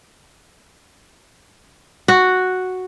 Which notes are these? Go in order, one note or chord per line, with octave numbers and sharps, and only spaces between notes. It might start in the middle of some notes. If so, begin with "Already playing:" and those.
F#4